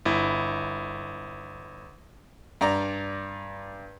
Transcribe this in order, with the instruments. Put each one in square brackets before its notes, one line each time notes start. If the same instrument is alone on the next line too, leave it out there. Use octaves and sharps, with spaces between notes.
[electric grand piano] G1 E4
[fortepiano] G2 D5 A#5